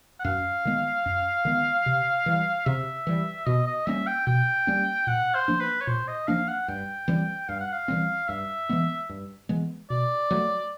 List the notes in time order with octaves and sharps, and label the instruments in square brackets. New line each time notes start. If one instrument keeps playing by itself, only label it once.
[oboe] F#5
[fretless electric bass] F#2 [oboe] F5
[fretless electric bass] D#3 G#3 B3
F#2
D#3 G#3 B3
C3
E3 G3
[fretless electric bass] C3 [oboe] E5
[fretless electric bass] E3 G3
[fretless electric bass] B2 [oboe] D#5
[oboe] D#5
[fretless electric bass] G3 A#3 C#4 [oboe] E5
[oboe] G5
[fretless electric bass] B2 [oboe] G5
[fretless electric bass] G3 A#3 C#4
[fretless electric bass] A#2 [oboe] F#5
[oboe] C5
[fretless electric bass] F3 A#3 D4
[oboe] B4
C#5
[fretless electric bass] A#2 [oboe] C5
[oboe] D#5
[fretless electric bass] F3 A#3 D4 [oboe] F5
[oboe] F#5
[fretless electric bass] G2 [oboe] G5
[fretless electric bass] E3 G3 C4
[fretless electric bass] G2 [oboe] F5
[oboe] F#5
F5
[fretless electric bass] E3 G3 C4
[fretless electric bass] G2 [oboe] E5
[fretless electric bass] E3 G#3 B3
G2
E3 G#3 B3
[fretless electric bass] B2 [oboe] D5
[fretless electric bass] F#3 A3